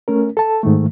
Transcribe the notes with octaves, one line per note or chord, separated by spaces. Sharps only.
A3 C#4 A#4
A4 A5
G#2 D#3 A3